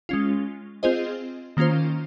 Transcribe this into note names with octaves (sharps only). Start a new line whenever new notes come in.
G#3 C#4 F4
C4 F4 G#4 C5 D#5
D#3 A#3 C#4 F4 C5